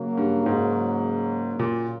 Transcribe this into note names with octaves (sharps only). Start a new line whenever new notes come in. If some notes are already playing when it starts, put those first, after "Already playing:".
Already playing: C#3 F#3 A#3
G2
G#2
A#2